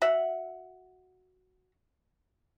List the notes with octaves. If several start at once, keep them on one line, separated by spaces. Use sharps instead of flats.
F#4 E5 F#5